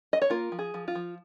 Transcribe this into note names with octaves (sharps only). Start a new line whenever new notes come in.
D#5
C#5
A#3 F4 A#4
F3
G#4
F3
F4
F3